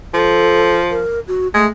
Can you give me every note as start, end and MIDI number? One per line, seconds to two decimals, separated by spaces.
0.14 1.07 53
0.14 0.76 69
0.90 1.20 70
1.28 1.48 66
1.54 1.67 56
1.54 1.68 57